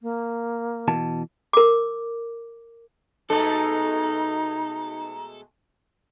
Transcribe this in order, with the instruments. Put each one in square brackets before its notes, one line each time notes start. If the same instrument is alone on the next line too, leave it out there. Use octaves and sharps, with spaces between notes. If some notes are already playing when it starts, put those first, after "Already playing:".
[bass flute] A#3
[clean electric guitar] B2 E3 A5
[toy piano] A#4 D6
[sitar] B2 G#3 A3 [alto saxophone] D#4 [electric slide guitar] A4 [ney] A#5